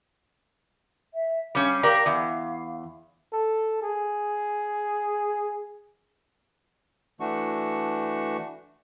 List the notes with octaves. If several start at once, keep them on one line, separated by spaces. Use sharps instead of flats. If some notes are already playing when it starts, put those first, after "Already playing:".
E5
G3 C#4 F5
G4 A#4 D5
E2 F5
A4
G#4
E3 A3 D4 F#4 C#6